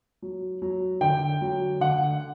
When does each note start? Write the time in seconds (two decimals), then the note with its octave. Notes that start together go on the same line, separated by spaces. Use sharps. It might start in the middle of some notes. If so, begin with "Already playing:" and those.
0.22 F#3
0.62 F#3
1.01 D3 G5
1.41 F#3
1.80 D3 F#5